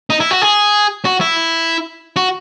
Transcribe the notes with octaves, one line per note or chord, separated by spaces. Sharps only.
D#4
E4
F#4
G#4
F#4
E4
F#4